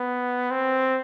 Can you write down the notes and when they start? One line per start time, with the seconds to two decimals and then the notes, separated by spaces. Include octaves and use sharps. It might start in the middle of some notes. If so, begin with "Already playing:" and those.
Already playing: B3
0.51 C4